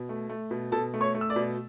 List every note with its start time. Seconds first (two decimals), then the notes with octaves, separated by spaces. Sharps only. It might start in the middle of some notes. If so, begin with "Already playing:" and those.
Already playing: B2
0.09 A3
0.29 A3
0.51 B2
0.72 B2 A4 A5
0.94 A3
1.01 C#5 C#6
1.15 A3
1.21 E6
1.30 D5 D6
1.36 B2